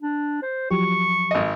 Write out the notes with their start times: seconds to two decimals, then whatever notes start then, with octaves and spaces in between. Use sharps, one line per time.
0.02 D4
0.42 C5
0.70 F3 F#3 G4 C#6
1.31 G#1 D#5